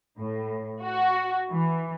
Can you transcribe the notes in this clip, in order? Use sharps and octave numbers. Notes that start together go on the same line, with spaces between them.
A2
F#4
E3